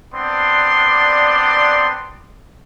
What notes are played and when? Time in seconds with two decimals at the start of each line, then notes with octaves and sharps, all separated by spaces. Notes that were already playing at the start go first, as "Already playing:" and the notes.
0.14 B3 C4 D4 D5 C6